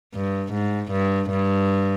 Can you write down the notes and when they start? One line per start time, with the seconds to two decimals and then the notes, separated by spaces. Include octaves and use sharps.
0.15 G2
0.53 G#2
0.92 G2
1.30 G2